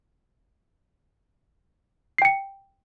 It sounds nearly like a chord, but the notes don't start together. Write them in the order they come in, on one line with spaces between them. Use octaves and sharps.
C7 G5 C#7